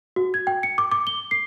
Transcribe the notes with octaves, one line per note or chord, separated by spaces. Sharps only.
F#4
G#6
G5
C#7
D6
D6
G7
C7